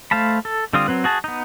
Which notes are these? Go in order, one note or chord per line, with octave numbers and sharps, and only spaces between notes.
A3 C5 F5 A5 B5
A4
D3 G3 C4 F4 D#6
F#3 C4 B4
F#4 G#4 A5
B3 D#4